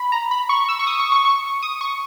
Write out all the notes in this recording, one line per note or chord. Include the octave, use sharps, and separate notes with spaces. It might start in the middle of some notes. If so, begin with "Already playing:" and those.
Already playing: B5
A#5
B5
C#6
E6
C#6
D#6
C#6
C#6
C#6
D#6
C#6